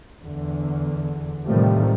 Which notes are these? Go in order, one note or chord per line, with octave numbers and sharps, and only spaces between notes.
E2 D3
A2 C3 D#3 F3 G3 A3